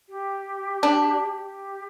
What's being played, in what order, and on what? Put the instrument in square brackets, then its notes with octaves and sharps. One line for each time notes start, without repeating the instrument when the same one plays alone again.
[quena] G4
[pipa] D4
[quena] G4